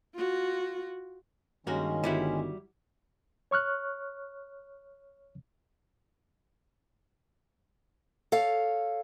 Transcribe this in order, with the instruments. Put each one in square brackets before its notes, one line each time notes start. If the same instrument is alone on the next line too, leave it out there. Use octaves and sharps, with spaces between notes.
[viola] F4 F#4
[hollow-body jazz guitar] G2 A#3 F#4 [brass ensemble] D#3 [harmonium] G#3 C#4
[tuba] G1 [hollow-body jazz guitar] G3 E4 F#4
[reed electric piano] C#5 C#6 F6 F#6
[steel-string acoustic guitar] A4 C#5 F5